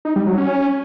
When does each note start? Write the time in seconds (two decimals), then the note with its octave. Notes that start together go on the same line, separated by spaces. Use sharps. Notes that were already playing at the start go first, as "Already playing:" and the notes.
0.05 D#4
0.16 G3
0.27 F#3
0.38 C#4